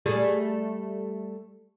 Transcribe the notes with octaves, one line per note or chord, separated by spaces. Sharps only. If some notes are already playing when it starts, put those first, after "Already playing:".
G3 A3 G#4